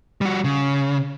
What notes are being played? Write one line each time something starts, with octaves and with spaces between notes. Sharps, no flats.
G3 F#4
C#3